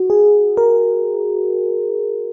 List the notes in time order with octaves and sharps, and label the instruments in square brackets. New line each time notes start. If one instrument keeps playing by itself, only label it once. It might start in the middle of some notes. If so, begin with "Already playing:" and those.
Already playing: [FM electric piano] F#4
G#4
A#4